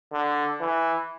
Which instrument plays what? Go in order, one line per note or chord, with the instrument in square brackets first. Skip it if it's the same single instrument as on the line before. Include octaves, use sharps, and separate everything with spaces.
[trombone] D3
E3